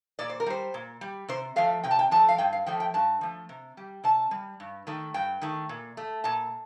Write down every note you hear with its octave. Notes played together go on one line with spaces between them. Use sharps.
A#2 D5
C5
A#4
G3 C5
A#2
G3
C3 C5
F3 A3 F5
C3 G5
A5
G5
F3 A3 A5
F5
G2 G5
F5
F3 A3 G5
G5
G2 A5
F3 A3
C3
G3
C3 A5
G3
G2
D#3 A3
G2 G5
D#3 A3
A#2
A3
A#2 A5